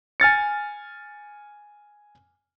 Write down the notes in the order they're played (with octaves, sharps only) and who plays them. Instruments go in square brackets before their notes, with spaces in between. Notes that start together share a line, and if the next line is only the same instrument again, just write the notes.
[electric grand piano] G#5 F6 A6 C#7